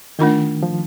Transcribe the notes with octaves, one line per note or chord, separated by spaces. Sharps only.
D#3 A3 D4 F4 A#4
F3